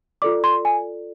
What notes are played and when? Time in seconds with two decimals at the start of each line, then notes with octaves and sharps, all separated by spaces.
0.22 F4 A4 D5 D6
0.44 C6
0.65 G#5